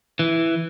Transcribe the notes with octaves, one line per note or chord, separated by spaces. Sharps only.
E3